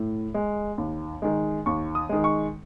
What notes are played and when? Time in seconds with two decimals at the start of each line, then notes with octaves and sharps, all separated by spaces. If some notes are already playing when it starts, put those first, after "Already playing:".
Already playing: A2
0.34 G#3
0.78 D#2
1.22 D#3 G#3
1.66 D#2 C#6
1.95 D#6
2.09 D#3 G#3
2.24 C#6